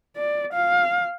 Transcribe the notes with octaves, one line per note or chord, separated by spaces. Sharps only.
D5
F5